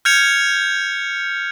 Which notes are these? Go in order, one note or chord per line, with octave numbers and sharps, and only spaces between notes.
F6 G6 G#6 C#7 F7